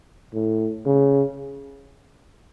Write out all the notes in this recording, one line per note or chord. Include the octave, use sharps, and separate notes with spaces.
A2
C#3